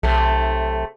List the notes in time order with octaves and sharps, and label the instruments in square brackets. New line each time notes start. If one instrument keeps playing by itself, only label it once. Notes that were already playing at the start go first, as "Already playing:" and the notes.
[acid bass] B1 [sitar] C3 A3